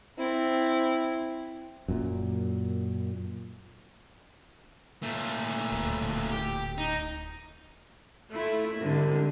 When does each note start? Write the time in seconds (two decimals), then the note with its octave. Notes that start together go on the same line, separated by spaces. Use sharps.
0.18 C4 E4
1.88 F#2 A#2
5.03 A#2 A3
5.72 D1
6.31 G4
6.78 D#4
8.32 A3 E4 F4
8.80 C2 G#2 D3